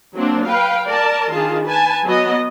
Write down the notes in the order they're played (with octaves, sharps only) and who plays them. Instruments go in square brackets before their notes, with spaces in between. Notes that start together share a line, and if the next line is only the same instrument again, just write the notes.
[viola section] F#3 A#3 C4 D4
B4 F5 G5
A#4 D5 A5
D#3 D4 F4 G#4 A5
B4 G#5 A5
F#3 B3 F#4 D#5